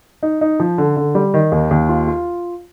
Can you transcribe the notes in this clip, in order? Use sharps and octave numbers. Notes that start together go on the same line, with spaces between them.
D#4
D#4
F3
D3
D3
G3
D#3
D#2
D#2
F4
F4